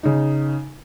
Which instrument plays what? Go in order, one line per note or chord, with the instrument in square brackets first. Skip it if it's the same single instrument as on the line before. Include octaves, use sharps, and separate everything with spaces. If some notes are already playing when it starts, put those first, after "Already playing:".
[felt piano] C#3 D#4